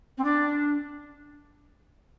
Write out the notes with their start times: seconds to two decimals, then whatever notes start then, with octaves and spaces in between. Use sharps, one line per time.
0.18 C4
0.24 D4